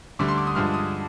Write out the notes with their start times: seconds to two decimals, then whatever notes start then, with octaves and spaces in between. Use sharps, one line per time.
0.19 D2 D3 G3 D6
0.28 C6
0.38 D6
0.47 D#6
0.55 G2 D3 F3 G#3 F6
0.74 D#6